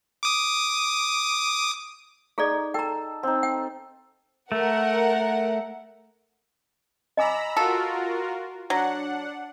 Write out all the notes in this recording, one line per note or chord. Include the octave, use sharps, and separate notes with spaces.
D6 D#6
D#4 G#4 A4 D5
A4 G5 A#5
C4 D#4
G5
A3 A#4 F#5
D#5 G#5 A#5 B5 D6 E6
F4 F#4 A4 A#4
F#3 D4 F#5